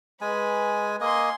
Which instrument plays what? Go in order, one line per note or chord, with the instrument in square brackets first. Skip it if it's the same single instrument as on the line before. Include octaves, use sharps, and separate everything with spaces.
[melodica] G#3 G#5 [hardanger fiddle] B4
[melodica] A#3 D#5 [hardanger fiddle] G#5 C6